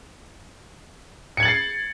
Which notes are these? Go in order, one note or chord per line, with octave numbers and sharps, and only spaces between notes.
G#6 A6 C7 C#7 F#7